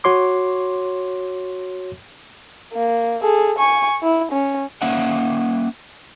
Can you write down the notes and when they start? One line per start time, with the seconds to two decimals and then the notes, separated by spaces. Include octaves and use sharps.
0.04 F#4 C#5 C6 D6
2.74 A#3
3.22 G#4 A4
3.58 G#5 C#6
4.03 E4
4.32 C#4
4.82 A#3 C#4 E5 F#5